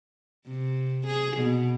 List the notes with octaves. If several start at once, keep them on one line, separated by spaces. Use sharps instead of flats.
C3
G#4
B2